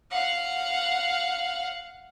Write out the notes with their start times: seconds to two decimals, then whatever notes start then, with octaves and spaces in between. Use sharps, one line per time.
0.11 F5 F#5